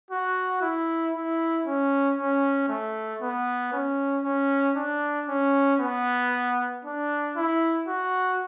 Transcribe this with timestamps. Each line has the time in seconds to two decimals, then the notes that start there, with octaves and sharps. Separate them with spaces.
0.11 F#4
0.62 E4
1.13 E4
1.66 C#4
2.18 C#4
2.69 A3
3.22 B3
3.73 C#4
4.24 C#4
4.76 D4
5.28 C#4
5.80 B3
6.85 D4
7.36 E4
7.88 F#4